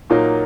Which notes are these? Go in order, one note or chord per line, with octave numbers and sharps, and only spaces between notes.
A#2 F#3 A#3 D#4